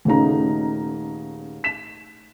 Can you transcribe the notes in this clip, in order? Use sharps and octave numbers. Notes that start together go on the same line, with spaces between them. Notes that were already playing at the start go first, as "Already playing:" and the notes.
D#1 C#3 A3 D#4 A#5
B6 E7